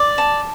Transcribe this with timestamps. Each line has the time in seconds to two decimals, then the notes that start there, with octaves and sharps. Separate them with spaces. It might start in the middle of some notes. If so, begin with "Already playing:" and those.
Already playing: D5
0.18 A5